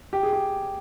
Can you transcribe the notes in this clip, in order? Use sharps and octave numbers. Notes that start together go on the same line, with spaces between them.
G4
G#4
G4